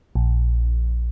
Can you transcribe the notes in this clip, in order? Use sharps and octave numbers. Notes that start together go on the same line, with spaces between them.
A#1